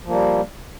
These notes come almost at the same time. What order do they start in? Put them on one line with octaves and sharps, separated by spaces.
F3 A#3 G3